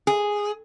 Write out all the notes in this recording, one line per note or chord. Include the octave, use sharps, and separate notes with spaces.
G#4